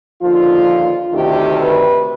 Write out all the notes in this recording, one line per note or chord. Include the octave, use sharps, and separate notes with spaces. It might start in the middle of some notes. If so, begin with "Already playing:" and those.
D#2 D3 F3 F4
D2 C3 D#3 G4
B4